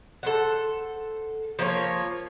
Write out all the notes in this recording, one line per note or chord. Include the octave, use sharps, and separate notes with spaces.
A4 C5 F#5
F3 A#3 F4 C#5